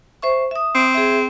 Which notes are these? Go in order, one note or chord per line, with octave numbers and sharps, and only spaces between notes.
C5 E5 C#6
E5 D#6
C4
G#4 E5